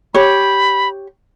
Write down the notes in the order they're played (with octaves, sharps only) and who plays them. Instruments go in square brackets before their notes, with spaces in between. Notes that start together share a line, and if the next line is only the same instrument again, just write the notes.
[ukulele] G4 C#5 [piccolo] B5